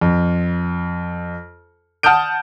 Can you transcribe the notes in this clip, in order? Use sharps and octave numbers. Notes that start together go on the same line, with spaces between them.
F2
F#5 A5 D#6 F6 G6 D7